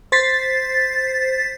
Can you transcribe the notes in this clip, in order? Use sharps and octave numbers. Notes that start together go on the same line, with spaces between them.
C5 A6 B6 C7